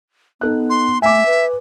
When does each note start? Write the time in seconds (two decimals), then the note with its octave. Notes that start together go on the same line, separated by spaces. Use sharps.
0.41 B3 D#4 A4 F#6
0.70 C6
1.02 A3 E5 G#5 D6
1.26 B4